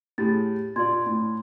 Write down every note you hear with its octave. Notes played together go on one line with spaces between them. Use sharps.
A2 G4 G#4 A6
A#2 F4 D5 C6 G#6
A2